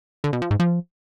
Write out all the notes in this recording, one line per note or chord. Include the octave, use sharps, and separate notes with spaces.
D3
B2
F3
G#2
F3